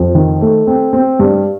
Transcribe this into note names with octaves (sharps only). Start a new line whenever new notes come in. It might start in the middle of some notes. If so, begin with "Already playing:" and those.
Already playing: F2
D#3
A3
C4
C4
G2